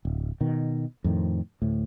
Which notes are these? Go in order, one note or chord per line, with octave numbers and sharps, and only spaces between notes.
D1
B2 D#3
F2 A2 D#3
D2 A2